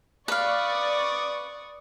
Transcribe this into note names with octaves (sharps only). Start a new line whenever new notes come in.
B4 D5 F5 C#6 D#6